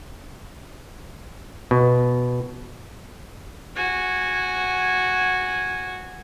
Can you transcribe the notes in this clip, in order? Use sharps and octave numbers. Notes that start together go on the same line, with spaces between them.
B2
F#4 G#5